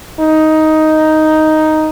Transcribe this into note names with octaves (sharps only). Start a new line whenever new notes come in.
D#4